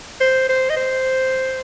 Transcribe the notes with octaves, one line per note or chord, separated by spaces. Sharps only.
C5
C5
D#5
C5